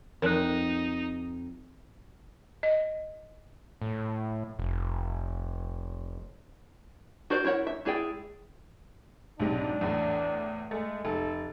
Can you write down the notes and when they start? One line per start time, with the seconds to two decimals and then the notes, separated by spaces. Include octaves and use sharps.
0.22 F2 D#4 A#4 F#6
2.63 D#5
3.82 A2
4.59 F1
7.30 F#4 A#4 C5 D5
7.44 E4 A#4 C#5 F#5
7.67 E5
7.85 G#3 E4 G#4 D5 G5
9.40 B1 G#2 C3 D4
9.81 E2 A2
10.71 G#3 A3
11.05 F1 A4